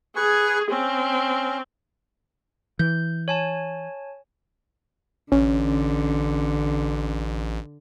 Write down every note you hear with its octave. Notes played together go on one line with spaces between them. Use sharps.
G#4 B4 G#5 C#6
C4 C#4
E3 G6
C#5 G#5 A5
A1 D3 C#4